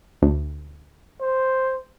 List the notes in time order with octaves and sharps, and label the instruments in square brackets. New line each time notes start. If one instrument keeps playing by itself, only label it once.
[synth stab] D2
[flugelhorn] C5